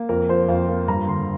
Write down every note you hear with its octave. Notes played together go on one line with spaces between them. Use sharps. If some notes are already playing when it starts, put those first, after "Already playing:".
Already playing: A#3
F2 A#4
F3 C5
F2 F5
A#3
G2 A#5
D3 C6